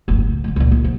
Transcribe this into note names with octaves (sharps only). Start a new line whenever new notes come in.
D1 G1
C#2
D3 G#3
C#2 A#2
D#3
F3